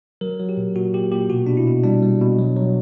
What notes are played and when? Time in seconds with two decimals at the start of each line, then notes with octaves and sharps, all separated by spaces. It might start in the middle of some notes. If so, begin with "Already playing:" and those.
0.21 F#3 A#4
0.40 F#3
0.49 G4
0.57 A#2
0.75 A#2 F#4
0.93 A#2 G4
1.12 A#2 G4
1.30 B2 F#4
1.47 B2 D4
1.57 E4
1.67 B2
1.84 G3 D4
2.02 G3
2.21 B2
2.39 F#3
2.57 F#3